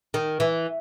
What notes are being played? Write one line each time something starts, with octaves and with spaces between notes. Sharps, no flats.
D#3
E3